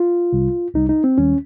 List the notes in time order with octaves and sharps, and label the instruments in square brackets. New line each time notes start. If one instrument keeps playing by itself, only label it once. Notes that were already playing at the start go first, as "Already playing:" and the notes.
Already playing: [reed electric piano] F4
C2 C3 G3
C2 C3 G3 D#4
D#4
C4
D#2 D#3 G3 C#4